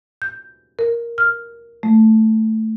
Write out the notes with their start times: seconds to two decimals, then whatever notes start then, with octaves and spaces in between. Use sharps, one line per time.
0.22 G6
0.79 A#4
1.18 F6
1.83 A3